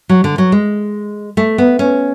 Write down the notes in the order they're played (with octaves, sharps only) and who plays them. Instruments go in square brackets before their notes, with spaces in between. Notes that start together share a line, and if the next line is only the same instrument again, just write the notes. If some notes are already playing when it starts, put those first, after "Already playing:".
[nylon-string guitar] F#3
D3
F#3
G#3
A3
B3
C#4